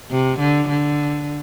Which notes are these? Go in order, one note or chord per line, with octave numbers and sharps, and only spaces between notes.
C3
D3
D3